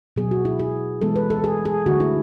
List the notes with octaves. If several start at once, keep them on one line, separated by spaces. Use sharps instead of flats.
B2 F#3 B3 G#4
F#4
E4
G#4
E3 G#3 B3 A4
B4
A4
G#4
G#4
D3 A3 F#4
E4